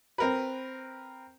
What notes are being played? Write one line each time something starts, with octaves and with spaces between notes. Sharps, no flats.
C4 A#4 B4